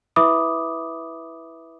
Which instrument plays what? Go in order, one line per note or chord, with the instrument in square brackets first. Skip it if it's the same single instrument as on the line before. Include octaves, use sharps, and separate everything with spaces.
[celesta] E4 B4 E5 B5 D6 D#6